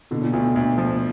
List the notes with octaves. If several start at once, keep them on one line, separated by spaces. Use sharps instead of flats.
B2 D3
A#2
D2 B2
D2
F3